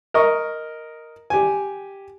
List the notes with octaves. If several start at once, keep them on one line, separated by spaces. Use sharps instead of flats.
A#4 D#5 C#6
G4 G#5